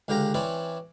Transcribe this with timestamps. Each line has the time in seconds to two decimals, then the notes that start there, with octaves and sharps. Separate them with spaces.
0.08 C#2 D3 G4 F5 G5 A#5
0.34 E3 C4 C#4 E4 B4 D5